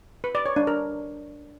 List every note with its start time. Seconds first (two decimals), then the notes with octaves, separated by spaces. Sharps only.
0.24 B4
0.35 D5
0.46 C#5
0.56 D4
0.67 A#4